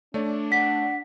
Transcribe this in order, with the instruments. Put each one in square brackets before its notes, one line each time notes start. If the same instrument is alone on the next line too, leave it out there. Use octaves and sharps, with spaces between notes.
[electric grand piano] A3 C#5 D5 [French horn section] D4
[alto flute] F#5 [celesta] B6